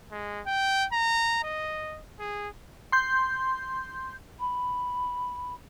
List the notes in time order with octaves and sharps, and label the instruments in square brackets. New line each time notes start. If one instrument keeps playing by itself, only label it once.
[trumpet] G#3
G5
A#5
D#5
G#4
[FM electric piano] C6 G6
[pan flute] B5